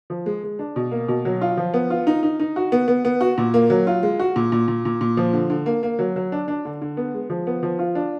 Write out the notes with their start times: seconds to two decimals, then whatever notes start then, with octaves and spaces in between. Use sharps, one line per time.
0.10 F3
0.26 G#3
0.43 G#3
0.59 D4
0.76 B2
0.91 A#3
1.08 B2
1.25 F#3
1.41 F4
1.57 F3
1.74 B3
1.90 F4
2.07 D#4
2.23 D#4
2.39 D#4
2.56 F#4
2.72 B3
2.88 B3
3.05 B3
3.21 F#4
3.38 A#2
3.54 A#3
3.70 F#3
3.87 F4
4.03 G#3
4.20 F#4
4.36 A#2
4.52 A#2
4.68 A#2
4.85 A#2
5.01 A#2
5.17 F3
5.33 D3
5.50 D3
5.66 A#3
5.83 A#3
5.99 F#3
6.16 F#3
6.32 D4
6.48 D4
6.65 D3
6.82 D3
6.97 B3
7.14 G#3
7.30 F3
7.47 B3
7.63 F3
7.79 F4
7.95 D4